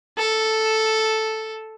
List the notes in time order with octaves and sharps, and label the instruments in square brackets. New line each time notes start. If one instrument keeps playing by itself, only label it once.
[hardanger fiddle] A4